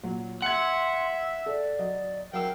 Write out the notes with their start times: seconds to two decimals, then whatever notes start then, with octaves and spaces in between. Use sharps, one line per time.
0.03 A#2 F#3
0.42 E5 F#5 C6 G#6 C#7
1.46 A4 D5
1.79 F#3 D#5
2.34 F#3 A#4 F5 G5 E6